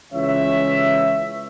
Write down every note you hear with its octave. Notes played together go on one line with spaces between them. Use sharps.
C#2 C#3 E3 C#5 E5